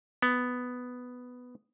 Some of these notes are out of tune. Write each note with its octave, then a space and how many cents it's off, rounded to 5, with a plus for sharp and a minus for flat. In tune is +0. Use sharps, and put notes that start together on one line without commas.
B3 +5